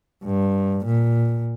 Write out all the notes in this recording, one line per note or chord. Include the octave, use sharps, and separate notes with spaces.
G2
A#2